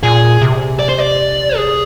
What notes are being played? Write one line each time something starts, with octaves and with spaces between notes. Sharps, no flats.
A#2 G#4
C3
D5
C5
D5
G#4